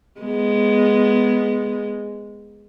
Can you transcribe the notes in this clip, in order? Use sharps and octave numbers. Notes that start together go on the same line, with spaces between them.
G#3 B3